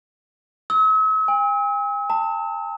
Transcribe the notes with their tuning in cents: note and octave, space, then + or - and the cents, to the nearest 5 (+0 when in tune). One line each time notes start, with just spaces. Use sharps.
E6 -45
G#5 -45
A5 +30